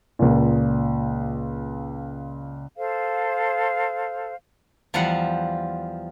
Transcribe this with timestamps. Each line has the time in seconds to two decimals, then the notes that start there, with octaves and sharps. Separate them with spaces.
0.19 C#2 A#2
2.77 A4 C5 F5
4.94 E2 F3 G3 C5 F#5